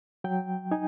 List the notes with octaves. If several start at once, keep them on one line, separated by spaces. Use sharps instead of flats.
F#3 G5
D#4 G#5